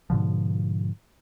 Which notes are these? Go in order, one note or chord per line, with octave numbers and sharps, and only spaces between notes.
G#2 B2 D3 F3